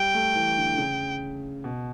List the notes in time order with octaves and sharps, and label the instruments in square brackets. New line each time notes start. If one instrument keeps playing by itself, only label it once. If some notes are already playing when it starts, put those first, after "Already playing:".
Already playing: [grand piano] G3 [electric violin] G5
[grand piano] A3
E3
D3
D3
C#3
B2